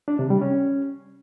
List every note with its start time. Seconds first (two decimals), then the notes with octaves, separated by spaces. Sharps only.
0.08 D4
0.19 C3
0.30 G3
0.41 C#4